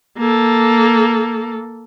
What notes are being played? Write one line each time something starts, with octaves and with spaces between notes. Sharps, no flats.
A#3 A4